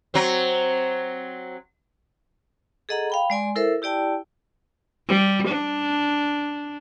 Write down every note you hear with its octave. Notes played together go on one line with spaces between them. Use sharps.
F#3 C4
G#4 A4 D#5 F#5 A#5
F5 G5 B5
G#3 D5 G#5 C6
E4 A4 A#4 C5 E5
E4 G4 D5 G5 A5
G3
D4